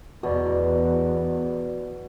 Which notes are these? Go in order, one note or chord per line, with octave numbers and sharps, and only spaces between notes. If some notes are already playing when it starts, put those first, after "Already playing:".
E2 B2 F#4 D5